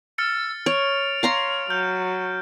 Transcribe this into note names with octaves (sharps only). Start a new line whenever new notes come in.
E6 F6 A6 C#7
C#5 D7 F7
C#5 F5 A#5 C6
F#3 F6 G6